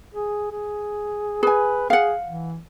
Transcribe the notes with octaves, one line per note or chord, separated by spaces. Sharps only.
G#4
G#4
G#4 B4 G#5
G#4 F5 F#5
E3